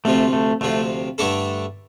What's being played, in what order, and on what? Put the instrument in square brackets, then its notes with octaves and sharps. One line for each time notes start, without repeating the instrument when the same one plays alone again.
[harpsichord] D2 C3 F3 [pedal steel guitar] A3
[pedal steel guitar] A3
[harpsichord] D2 C3 F3 [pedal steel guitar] A3
[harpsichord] G2 D3 A3 D4 A4